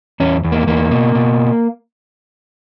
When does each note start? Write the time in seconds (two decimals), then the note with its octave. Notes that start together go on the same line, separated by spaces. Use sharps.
0.20 E2 C#4
0.44 E2
0.52 A#3
0.67 E2 A#3
0.90 B2
1.15 B2